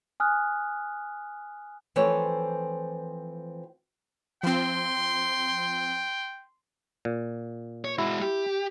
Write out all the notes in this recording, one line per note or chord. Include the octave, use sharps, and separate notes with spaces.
G#5 D#6 F6 F#6
E3 F3 A3 C4 C#5
F3 C4 G5 C6
A#2
C#5
G#3 E4 F#4
G4